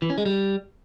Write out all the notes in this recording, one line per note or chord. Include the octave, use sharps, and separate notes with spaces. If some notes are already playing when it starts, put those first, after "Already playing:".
E3
C#4
G#3
G3